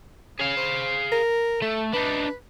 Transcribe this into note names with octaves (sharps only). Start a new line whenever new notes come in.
C#4 G#4 F5
C5
A#4
A3 A4
D4 D#4 B4